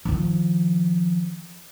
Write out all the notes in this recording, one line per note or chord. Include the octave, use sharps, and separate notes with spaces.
D#3 F3